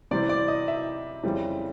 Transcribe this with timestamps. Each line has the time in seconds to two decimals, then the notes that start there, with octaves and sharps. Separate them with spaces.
0.11 C3 E3 G3 C4 D5
0.29 D5
0.48 D#5
0.68 E5
1.23 F2 C#3 E3 G3 C4